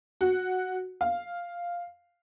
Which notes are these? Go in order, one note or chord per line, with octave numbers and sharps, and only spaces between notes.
F#4
F5